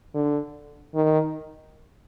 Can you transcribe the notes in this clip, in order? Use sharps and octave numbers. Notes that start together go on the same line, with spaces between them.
D3
D#3